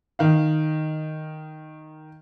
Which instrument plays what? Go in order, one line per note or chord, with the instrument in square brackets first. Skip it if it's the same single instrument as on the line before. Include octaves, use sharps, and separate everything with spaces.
[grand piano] D#3 F5